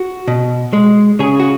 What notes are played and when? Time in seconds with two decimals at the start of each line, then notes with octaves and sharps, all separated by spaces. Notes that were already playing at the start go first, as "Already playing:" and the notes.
Already playing: F#4
0.28 B2
0.73 G#3
1.19 C#3 G#4
1.40 F#4